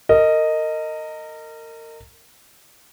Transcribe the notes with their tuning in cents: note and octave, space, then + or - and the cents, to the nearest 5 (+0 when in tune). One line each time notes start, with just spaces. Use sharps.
A#4 -30 D#5 +0